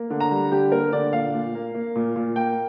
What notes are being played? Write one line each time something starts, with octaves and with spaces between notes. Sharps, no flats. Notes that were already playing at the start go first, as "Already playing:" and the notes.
Already playing: A#3
D3
A#5
G3
D3 G4
A#3 A#4
D3 D5
A#2 F5
A#2
A#3
A#3
A#2
A#2
A#3 G5